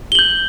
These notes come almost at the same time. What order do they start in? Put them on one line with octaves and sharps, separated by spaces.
G7 F#7 G6